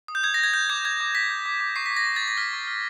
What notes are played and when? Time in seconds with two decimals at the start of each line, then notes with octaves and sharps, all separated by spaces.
0.08 D#6
0.15 G6
0.23 D#6 G#6
0.34 A#6
0.39 G6 G#6
0.54 G6
0.69 D6 G#6
0.85 G6 G#6
1.00 D6
1.15 G6 B6
1.30 G6
1.46 D6
1.61 D6
1.76 C#6 C7
1.86 B6
1.91 C#6
1.97 A#6
2.07 C#6
2.16 A6
2.22 C#6
2.28 A#6
2.37 F6 B6
2.53 C#6
2.67 F6